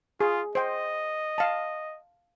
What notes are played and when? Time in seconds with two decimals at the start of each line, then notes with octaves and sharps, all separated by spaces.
0.20 F4 G#4
0.55 C5 D#5 G5
1.38 F5 A5